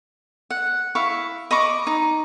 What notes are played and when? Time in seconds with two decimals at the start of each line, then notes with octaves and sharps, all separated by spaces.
0.50 F#5
0.95 E4 F5 C#6
1.51 D#5 B5 C#6 D6
1.87 D#4